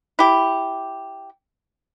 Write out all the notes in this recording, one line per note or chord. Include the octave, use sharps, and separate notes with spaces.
E4 G4